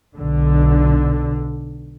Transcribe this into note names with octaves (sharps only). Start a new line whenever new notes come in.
B1 D3